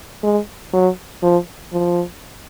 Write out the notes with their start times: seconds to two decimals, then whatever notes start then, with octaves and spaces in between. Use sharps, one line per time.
0.23 G#3
0.73 F#3
1.22 F3
1.72 F3